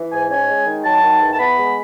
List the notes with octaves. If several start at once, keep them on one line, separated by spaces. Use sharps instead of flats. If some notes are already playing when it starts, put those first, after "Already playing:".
Already playing: E3
G#2 G#5
C#4 G#5
G#3
D#3
F#3 A5
D#3
E2
A5
B3 B5
G#3